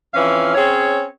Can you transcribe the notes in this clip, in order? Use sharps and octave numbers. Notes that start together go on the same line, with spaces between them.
F2 E3 C#4 F5
C4 C#4 G#4 C#5